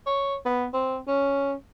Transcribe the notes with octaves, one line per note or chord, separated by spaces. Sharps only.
C#5
B3
C4
C#4